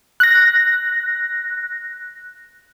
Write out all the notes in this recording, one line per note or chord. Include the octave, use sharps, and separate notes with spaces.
F#6 A#6